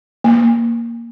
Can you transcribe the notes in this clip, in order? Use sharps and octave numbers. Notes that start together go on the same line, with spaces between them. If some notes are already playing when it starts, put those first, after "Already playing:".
A#3